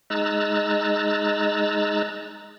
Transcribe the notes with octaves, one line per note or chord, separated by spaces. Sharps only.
G#3 D#4 A#5 E6 F#6 A6